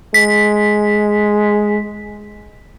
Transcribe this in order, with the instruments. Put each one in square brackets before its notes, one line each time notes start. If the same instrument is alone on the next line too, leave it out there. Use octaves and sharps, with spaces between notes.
[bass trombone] G#3 [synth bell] B6